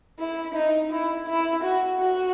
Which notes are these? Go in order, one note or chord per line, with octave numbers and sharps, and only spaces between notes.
E4
D#4
E4
E4
F#4
F#4